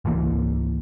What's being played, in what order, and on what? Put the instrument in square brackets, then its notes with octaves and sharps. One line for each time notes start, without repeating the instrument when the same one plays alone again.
[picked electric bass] G#1 C#2 E3 A#3